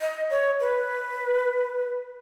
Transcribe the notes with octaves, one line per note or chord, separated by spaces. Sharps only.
D#5
C#5
B4